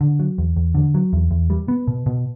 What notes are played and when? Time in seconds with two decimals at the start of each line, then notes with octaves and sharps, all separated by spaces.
0.01 D3
0.19 F#3
0.38 E2
0.56 E2
0.75 D3
0.94 F#3
1.13 E2
1.31 E2
1.50 G3
1.68 B3
1.88 B2
2.06 B2